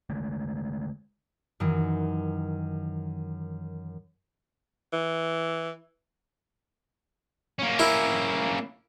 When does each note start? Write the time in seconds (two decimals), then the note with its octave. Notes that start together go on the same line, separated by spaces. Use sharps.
0.10 D3 G#3 A3
1.60 F#2 D#3 E3
4.93 E3
7.59 A#3 C#4
7.79 E4 A#4